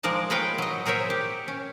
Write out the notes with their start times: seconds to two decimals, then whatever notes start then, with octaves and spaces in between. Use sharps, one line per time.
0.03 F3 G#3 A#4 D5 A5
0.30 G#3 A#4 B4 C#5 F5 G5
0.58 F#3 D#5
0.86 G#4 A#4 C5 C#5 E5
1.10 G4
1.48 C#4